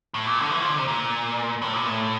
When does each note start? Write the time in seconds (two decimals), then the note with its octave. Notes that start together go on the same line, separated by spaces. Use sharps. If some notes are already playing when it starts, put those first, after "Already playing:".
0.14 A2
0.26 A#2
0.39 D3
0.50 E3
0.60 F3
0.69 D3
0.78 C3
0.88 A#2
1.62 A2
1.74 A#2
1.86 A2